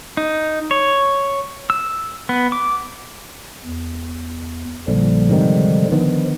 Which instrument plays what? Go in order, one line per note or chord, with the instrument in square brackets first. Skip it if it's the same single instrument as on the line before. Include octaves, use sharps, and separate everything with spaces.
[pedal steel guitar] D#4
C#5
E6
B3
D6
[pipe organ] E2
[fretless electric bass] A#1 [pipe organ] D3 F3 G3
[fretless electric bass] G#2 C3 D#3
[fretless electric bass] D3 D#3 B3 [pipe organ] F3